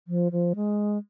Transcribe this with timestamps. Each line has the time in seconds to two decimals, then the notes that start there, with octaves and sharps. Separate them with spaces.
0.08 F3
0.32 F3
0.56 G#3